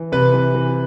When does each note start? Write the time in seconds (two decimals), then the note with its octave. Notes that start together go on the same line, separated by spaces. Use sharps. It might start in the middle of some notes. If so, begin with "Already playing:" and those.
Already playing: E3
0.12 C3 B4
0.34 E3
0.55 E3